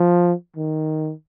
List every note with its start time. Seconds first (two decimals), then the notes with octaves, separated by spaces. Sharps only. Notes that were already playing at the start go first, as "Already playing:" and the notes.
Already playing: F3
0.56 D#3